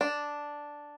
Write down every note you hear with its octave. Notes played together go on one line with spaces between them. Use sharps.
D4